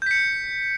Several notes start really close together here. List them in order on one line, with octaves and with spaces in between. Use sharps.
G6 B6 C#7